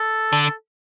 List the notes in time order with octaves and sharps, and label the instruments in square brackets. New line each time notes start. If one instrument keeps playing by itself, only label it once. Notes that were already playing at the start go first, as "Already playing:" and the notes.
Already playing: [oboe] A4
[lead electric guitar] D3